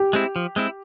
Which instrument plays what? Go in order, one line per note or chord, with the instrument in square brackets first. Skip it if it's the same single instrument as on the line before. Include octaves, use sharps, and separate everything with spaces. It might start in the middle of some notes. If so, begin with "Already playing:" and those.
Already playing: [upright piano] G4
[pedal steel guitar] G#3 C4 E4
F3
G#3 C4 E4